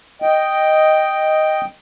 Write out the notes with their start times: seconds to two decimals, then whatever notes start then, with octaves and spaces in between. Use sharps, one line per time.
0.22 D#5 G5